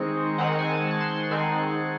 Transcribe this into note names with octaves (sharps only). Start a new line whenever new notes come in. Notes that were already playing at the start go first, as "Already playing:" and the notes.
Already playing: D#3 G#3 C4 D#4 C#6
D#3 G#3 C4 D#4 F#5
G#5
A5
A5
C6
D#3 G#3 C4 D#4 G#5